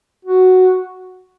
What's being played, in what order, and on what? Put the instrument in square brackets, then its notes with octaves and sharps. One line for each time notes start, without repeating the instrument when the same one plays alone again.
[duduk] F#4